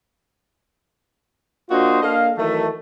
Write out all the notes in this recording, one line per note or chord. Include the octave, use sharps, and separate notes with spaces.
A#3 D4 F4 F#4 C5 D#5
A#3 D4 A4 D#5 F5
D#3 E3 F#3 A3